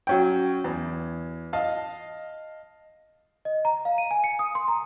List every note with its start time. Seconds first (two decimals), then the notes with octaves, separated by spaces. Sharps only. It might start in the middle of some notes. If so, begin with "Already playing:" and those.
0.07 F#3 C#4 G5
0.64 E2
1.53 D#5 F5 A5
3.45 D#5
3.65 A#5
3.85 F5
3.98 D#7
4.11 G#5
4.24 C#7
4.39 D#6
4.55 C6
4.68 A#5